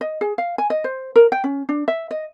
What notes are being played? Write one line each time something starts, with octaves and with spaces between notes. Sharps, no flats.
D#5
G#4
F5
G#5
D#5
C5
A#4
G5
C#4
D4
E5
D#5